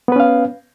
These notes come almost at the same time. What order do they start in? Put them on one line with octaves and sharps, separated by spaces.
B3 B4 C#4 F5